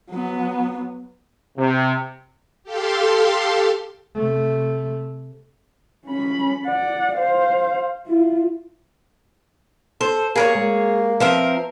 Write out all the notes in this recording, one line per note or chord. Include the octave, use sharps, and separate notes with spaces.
F#3 B3
C3
G4 A4 F5 C6
C3 A3
C#4 B5
D5 F#5
C5 F5
E4 F4
A4 C5
A#3 G#4 A#4 C#5
G#3 A#3
F3 C4 A#4 B4 E5 F5